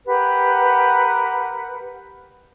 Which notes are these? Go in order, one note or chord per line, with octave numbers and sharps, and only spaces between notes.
G4 A#4 B4 F#5